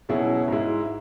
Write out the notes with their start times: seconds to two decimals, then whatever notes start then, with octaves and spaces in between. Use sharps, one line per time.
0.09 B2 F#3 C#4 E4 G#4
0.48 G#2 G#3 E4